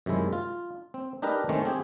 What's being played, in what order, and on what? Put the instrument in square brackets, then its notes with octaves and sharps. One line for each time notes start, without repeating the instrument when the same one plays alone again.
[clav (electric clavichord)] F#2 C3 D#3 G#3 E4
F4
C4
D4 D#4 G4 A#4 B4
D#3 A3 C4 C#4
C4 G4 G#4